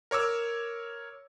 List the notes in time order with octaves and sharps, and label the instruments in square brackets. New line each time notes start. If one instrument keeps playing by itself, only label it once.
[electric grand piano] A#4 C#5 D6 E6